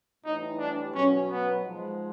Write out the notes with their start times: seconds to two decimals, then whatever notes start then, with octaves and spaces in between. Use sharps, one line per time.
0.24 A2 E3 G3 D#4
0.60 D4
0.93 B2 F#3 C#4
1.29 B3
1.63 G#2 F3 G#3